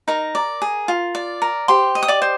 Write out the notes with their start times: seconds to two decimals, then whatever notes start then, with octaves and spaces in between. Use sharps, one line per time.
0.08 D#4 A#4 A#5
0.35 D5
0.62 G#4
0.88 F4
1.15 D5
1.42 A#4
1.68 G4 C5 C6
1.95 D#5
2.03 D#6
2.08 D5 D6
2.22 C5